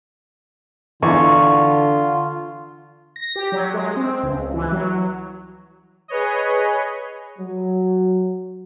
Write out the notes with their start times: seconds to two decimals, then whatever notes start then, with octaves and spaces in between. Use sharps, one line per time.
1.02 E2 D3 F4 C#6
3.16 A#6
3.36 G4
3.52 F#3
3.74 G#3
3.96 C4
4.23 C#2
4.54 E3
4.72 F#3
6.08 G#4 B4 C#5 D#5
7.39 F#3